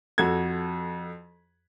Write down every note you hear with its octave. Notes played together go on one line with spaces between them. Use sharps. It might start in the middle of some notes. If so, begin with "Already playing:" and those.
F2 F#4 A4 G#6